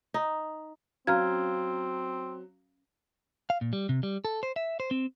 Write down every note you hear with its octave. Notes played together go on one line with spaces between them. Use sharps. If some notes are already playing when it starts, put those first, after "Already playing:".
D#4
F#3 C4 C#4 B4 F5 A#5 F6 G#6
F5
A#2
G3
C3
G3
A4
C5
E5
C5
C4